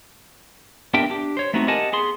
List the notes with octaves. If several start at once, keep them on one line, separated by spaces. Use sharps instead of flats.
B3 D4 G4 A#4 E5 G5
D4 G4
C5 C#5
A3 B3 C4 D#4 F#4
G4 A#4 D#5 F#5 G#5 A5
B3 G#4 C6